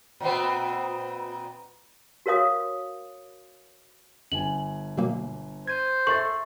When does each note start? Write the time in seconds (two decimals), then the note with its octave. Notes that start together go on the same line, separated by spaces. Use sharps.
0.20 A#2 B3 C4
2.26 F#4 A#4 C#5 F5 D#6
4.32 G1 G#5 F#7
4.98 B2 F#3 A#3
5.67 C5 G#6 D#7
6.07 A4 E5 C#6 A6 C7